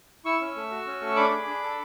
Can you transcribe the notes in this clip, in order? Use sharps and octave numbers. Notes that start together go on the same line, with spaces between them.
E4 C#6 E6
C#4
A3
F#4
C#4
A3
E6
D4 B5 D6
G#4
D4
A4